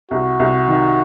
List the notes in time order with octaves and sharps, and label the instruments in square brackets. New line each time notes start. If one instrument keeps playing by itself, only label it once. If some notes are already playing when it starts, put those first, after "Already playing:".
[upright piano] C2 [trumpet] F#4
[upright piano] C2
D#3